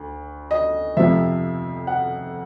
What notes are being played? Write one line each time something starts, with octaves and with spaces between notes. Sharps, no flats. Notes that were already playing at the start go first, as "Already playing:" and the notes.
Already playing: D2
D#5
F2 C3 F3 E5
F#5